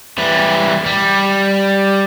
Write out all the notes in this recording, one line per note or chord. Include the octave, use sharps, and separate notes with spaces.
E3 G3
G3